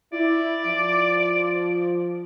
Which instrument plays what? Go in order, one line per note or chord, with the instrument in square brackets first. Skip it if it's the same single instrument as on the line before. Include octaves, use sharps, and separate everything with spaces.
[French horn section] E4 [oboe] D5
[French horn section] F3